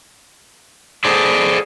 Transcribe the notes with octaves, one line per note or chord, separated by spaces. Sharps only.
G#4 A4 C5 D5